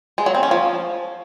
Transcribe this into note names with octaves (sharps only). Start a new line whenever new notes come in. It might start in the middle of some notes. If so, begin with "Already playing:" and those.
G#3
F#3
C4
C#4
F3